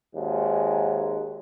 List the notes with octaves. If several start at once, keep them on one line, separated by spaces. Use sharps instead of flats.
G#1 D#2 G#3